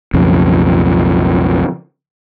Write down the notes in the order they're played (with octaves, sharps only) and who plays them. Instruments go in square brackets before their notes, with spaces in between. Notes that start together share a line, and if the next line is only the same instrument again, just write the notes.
[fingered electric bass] B1 F2 C#3